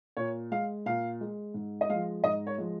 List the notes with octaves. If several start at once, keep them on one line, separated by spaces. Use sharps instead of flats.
A#2 C#5
G#3 F5
A#2 F5
G#3
G#2
D#5
F3 G#3 F5
G#2 D#5
C#5
F3 G#3